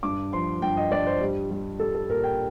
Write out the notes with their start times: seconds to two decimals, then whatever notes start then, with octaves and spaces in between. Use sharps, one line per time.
0.03 G2 D6
0.33 F3 C6
0.62 G2 G5
0.77 D#5
0.92 G2 D5
1.07 C5
1.21 G3
1.51 G3
1.79 G3 A4
1.94 A4
2.09 A#2 A#4
2.24 G5